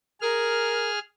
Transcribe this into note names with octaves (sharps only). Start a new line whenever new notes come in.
G#4 A#4 F6